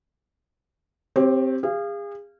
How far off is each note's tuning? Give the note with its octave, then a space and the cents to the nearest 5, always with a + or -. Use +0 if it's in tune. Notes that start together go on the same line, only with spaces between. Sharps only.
C4 +0 G4 +0 C#5 -35
G#4 -35 F5 -20